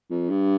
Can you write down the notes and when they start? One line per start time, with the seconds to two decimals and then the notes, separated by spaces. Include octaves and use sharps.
0.10 F2
0.30 G2